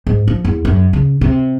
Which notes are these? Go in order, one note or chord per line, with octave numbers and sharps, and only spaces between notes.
G#2
F3
E2
F#2
C#3
C3